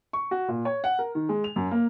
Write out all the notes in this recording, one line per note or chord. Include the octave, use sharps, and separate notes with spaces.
C#6
F#4
A#2
C#5
F#5
A#4
D#3
G#3
F7
F#2
A#3